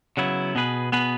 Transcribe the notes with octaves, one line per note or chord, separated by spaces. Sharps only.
C#3 F#3 B3 E4
B2 B3 G#4 B4
B2 B3 G#4 B4